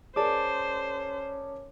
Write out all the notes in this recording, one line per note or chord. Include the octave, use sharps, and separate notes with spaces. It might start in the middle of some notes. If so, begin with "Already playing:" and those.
C#4 G#4 A#4 C5 D5 A5 D6